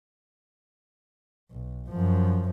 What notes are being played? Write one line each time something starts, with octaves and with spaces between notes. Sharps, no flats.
B1
F#2 F3